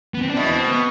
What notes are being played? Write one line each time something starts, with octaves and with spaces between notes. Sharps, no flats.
B3
C4
D4
B2 E4
B3
C4
B3